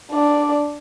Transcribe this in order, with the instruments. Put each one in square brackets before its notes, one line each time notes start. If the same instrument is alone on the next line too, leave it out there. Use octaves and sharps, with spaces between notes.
[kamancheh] D4 D5